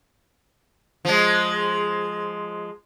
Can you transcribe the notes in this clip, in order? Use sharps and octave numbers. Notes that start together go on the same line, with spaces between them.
F3 G#3